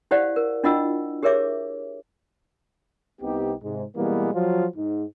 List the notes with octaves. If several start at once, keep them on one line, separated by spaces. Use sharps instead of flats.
E4 G4 C5 D5 F5 F#5
A#4
D4 E4 F4 D#5 F#5 E6
G4 G#4 A#4 C#5 E5 D6
C2 C3 B3 D#4 G4
G#2 C3 G#3
B2 E3 G3 G#3 A#3 B3
F3 F#3 F4
G#2